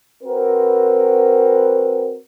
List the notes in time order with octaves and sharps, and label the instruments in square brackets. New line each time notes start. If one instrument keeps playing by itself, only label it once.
[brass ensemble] C4 F#4 A#4 B4